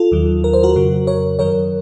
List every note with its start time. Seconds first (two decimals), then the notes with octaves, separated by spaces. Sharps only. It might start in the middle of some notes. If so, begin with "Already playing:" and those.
Already playing: F4 A4
0.12 D#2 D#3 F#3
0.44 A#4
0.53 C5
0.63 F#4 A#4
0.76 F2 C#3 F#3
1.07 A#4 C#5
1.39 F#2 D#3 F#3 A#4 C#5